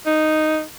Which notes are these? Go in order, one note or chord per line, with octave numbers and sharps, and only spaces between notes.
D#4